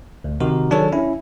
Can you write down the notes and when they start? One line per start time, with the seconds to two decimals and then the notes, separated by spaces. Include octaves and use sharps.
0.24 D2
0.40 C3 D#3 D#4 F#4 A#4
0.70 D#3 F#3 D4 G#4 A4 C#5
0.92 C#4 E4